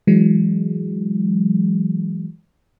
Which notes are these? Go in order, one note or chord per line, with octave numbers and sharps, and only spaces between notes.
E3 F#3 G#3